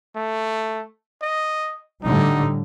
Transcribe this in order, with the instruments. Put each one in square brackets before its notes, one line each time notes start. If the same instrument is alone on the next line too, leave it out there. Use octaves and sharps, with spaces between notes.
[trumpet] A3
D#5
[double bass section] A2 D3 G3 [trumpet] D#4